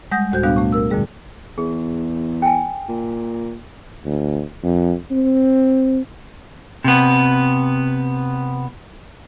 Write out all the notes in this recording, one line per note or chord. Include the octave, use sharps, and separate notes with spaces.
G3 G#3 F#5 D#6 G6 A#6
D2 A2 F#4 C5 G6
B2 G3 B3 D4 F5 F#6
A3 C#6
A#4 E6
F2 A#2 D3 G3 G#4
E2 G#4
G5 G#5
A#2
D2
F2
C4
C3 B3